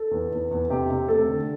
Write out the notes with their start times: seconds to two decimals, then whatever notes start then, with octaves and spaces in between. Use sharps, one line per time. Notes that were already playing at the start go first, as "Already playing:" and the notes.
Already playing: A4
0.11 E2
0.31 E2
0.51 E2
0.70 C3 G4
0.90 C3
1.08 A3 A4
1.28 D3